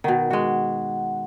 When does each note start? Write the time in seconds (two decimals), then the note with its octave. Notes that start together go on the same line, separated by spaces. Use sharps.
0.04 B2 D#3 F#5
0.30 G#3 F#4